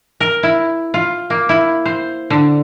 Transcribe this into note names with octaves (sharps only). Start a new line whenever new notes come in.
A#4
E4
F4
A#3
E4
C5
D3